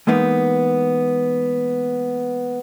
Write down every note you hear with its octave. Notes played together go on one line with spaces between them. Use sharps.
E3 G#3 A#3 B3 D#4